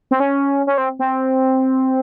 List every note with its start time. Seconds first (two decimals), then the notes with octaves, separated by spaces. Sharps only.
0.11 C4
0.20 C#4
0.67 C#4
0.78 C4
0.99 C4